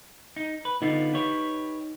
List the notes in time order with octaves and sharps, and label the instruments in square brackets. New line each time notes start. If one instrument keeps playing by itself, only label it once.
[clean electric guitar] D#4
B4
[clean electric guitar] D3 B3 F4 [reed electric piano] D#4
[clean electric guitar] G4 B4 C#5